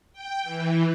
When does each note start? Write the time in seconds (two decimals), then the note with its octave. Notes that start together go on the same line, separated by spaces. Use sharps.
0.13 G5
0.44 E3